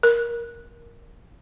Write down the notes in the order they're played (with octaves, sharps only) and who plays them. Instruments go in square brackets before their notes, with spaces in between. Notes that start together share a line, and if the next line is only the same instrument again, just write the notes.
[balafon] A#4